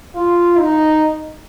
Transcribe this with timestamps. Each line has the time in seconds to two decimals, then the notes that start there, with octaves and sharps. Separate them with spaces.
0.15 F4
0.58 D#4